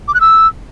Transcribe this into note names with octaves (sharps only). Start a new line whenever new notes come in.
D6
F#6
E6